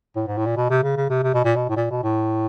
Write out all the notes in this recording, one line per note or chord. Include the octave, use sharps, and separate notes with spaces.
A2
G#2
A2
A#2
B2
C3
C#3
C#3
C3
C3
B2
A#2
B2
A2
A#2
B2
A2